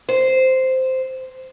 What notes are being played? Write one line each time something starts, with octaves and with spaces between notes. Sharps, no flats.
C5